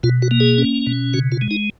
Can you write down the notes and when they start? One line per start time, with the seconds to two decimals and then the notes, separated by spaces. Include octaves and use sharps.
0.03 B2 F4
0.22 F#4
0.31 A#3
0.40 G#4
0.58 C#4
0.87 B2
1.14 C#3 F#4
1.32 F4
1.41 G#3
1.51 D#4